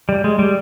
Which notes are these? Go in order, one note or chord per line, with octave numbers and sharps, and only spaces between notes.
G3
G#3
G3